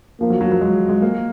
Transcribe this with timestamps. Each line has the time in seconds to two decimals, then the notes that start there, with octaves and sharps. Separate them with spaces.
0.21 F3 A#3
0.30 F#3
0.41 F#3
0.52 F#3
0.61 G#3
0.89 G#3
1.02 A#3